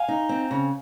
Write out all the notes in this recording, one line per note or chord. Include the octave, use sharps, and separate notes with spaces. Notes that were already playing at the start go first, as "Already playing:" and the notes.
Already playing: F5 G#5
D#4
C4
C#3